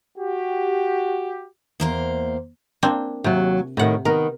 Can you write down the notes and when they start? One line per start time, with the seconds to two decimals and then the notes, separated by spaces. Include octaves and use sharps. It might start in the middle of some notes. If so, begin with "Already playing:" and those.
0.18 F#4 G4
1.80 E2 A#3 C5
2.83 A#3 C4 D4
3.24 D#2 C3 F#3
3.77 A2 C3 D#3 F#5
4.05 D#3 B3 A#4